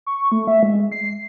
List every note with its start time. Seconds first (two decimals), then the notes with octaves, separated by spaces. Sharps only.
0.07 C#6
0.32 A3
0.47 E5
0.63 G#3
0.92 C7